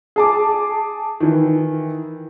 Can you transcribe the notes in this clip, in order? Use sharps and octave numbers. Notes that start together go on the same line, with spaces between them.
G#4 A5 D6
D#3 E3